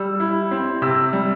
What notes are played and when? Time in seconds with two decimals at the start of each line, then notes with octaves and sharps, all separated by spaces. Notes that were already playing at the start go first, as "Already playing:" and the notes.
Already playing: G3 E6
0.20 E4
0.51 C4
0.82 C3 E6
1.13 G3